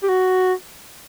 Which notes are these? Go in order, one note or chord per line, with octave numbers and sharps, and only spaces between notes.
G4
F#4